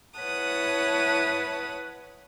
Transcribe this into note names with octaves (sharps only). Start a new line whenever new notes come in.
E4 B4 C#5 F#5 A5 D#6